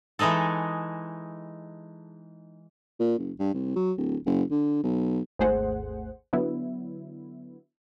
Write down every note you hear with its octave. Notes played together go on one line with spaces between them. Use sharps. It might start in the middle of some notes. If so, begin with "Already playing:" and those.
E3 G#3 D#4 G#4 A4
A#2
F#1
G2
C2
F#3
D1
F#1
D3
B1
G#1 D#2 A3 G#4 C5 F#5
D3 F#3 B3 E4